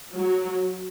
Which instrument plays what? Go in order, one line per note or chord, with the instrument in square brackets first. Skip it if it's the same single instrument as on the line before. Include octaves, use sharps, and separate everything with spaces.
[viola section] F#3